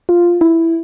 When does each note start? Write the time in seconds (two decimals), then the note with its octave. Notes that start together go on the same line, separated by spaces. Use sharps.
0.09 F4
0.41 E4